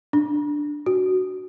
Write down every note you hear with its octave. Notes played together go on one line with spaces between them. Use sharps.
D4
F#4